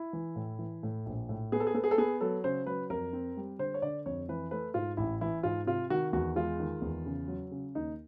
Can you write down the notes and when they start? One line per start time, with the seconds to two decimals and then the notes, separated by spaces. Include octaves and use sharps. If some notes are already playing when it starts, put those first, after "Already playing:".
Already playing: E4
0.13 E3
0.36 A2
0.59 E3
0.83 A2
1.06 A#1
1.29 A2
1.52 B3 G#4
1.60 A4
1.67 G#4
1.74 B3 A4
1.84 G#4
1.91 A4
1.98 B3 G#4
2.21 F#3 A4
2.44 C#3 C5
2.67 F#3 B4
2.90 F2 A#4
3.13 C4
3.37 G3
3.59 D3 C5
3.74 C#5
3.82 D3 D5
4.06 F2 C#5
4.29 E3 B4
4.51 A3 B4
4.74 G#2 F4
4.97 A1 E4
5.21 E3 E4
5.43 G#2 F4
5.66 C3 F4
5.90 D#3 F#4
6.13 E2 F#4
6.36 G#3 F4
6.60 D#3
6.82 E2
7.06 C#3
7.28 F#3
7.51 C#3
7.75 D#2 D#4